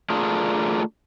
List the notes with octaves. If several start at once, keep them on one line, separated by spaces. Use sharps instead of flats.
A3 D4 F4 G#4 A#4